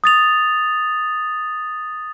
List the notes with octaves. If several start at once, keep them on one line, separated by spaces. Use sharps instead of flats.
D#6 A6 F7